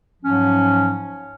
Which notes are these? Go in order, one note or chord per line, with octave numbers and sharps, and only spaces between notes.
G#2 F3 F#3 C#4